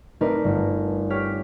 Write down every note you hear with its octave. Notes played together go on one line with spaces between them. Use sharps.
A3 C4 D4 D#4 A#4 B4
G1
G4 C#5 F6 B6